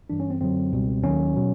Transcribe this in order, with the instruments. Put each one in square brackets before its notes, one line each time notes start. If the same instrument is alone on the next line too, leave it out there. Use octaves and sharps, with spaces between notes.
[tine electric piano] G2 E3 G3 D4
C#4
C4
F#2 D3 F#3 C4
C#2 B2 G3
D#2 D#3 F#3 C#4
B2 F#3